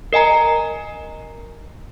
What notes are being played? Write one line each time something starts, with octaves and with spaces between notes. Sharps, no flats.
A#4 D#5 G#5 A#5